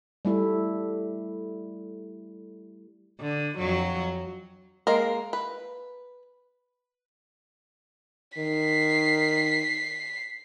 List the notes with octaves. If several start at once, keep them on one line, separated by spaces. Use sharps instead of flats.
G3 A3 E4
D3
F2 F#3
G#3 A#3 A#4
B4
D#3 B6 C7